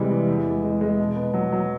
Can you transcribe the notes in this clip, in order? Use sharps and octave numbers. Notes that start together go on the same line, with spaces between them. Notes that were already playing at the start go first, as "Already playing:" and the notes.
Already playing: C3 E3 G3 G#3
E3
E2
G#3
G#3
G#3
B2
B3
F#3
F#3